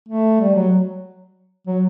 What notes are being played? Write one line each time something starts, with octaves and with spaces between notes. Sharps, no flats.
A3
G3
F#3
F#3